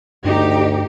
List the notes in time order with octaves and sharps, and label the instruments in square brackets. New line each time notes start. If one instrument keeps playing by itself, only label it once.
[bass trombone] D2 [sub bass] G2 [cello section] D#4 G4